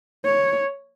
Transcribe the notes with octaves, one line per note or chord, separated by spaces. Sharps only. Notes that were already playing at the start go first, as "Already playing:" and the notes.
C#5